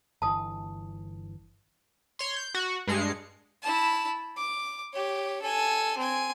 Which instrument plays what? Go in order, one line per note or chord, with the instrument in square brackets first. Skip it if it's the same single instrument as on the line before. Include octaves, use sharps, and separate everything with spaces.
[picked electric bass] G1 E3 [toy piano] A5 D#6
[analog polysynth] C#5 C6
G6
F#4
G2 G#3 C7 C#7
[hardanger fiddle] E4 A5
D6
G4 C#5
A4 G#5
C4 G#5